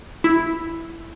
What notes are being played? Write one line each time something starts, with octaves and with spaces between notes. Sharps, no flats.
E4